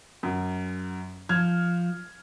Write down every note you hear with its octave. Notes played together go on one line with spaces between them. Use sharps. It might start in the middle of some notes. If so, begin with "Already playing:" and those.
F#2
F3 F6 G#6